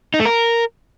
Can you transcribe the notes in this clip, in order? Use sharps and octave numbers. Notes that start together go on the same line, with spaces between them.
D#4
A3
A#4